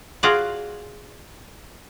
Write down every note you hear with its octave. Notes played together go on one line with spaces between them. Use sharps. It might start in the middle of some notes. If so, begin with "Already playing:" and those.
F4 F#4 G#4 D5 F#5